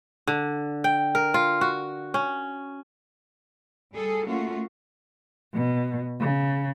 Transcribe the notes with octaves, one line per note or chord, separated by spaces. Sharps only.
D3
G5
A#4
F4
F#4
C#4
G3 G#4 A4
A3 A#3 C#4 F4 F#4
B2
C#3